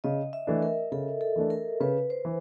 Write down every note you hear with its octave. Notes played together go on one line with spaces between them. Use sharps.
C#3 D#5
E5
E3 A3 D4
A#4
C#3 A4
A4
E3 A3 D4
A#4
C#3 B4
C5
E3